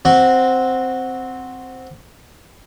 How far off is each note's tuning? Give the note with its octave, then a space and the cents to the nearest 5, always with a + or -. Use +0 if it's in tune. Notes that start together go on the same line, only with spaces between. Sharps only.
C4 +0 F#4 -5